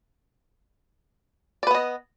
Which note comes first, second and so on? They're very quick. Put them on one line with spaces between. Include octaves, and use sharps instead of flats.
D5 B4 B3 D#5